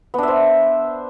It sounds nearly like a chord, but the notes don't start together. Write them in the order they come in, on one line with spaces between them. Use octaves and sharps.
B3 D4 E5 C5